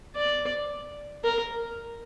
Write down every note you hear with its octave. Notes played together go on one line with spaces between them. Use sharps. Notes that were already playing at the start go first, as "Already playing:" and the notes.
D5
A#4